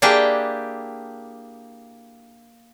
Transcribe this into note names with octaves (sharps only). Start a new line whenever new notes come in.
A#3 D4 E4 G4 G#4 G5